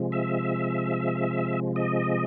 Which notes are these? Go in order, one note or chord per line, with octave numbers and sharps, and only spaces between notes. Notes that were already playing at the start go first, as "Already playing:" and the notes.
Already playing: C3 F3 G#3
E5
D#5